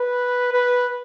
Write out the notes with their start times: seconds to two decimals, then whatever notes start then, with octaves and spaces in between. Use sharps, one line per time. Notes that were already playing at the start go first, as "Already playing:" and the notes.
Already playing: B4
0.52 B4